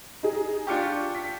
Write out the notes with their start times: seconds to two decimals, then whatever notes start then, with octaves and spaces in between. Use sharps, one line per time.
0.23 D#4 G#4
0.67 D4 F4 G4 C#6 F6 C#7
1.15 B6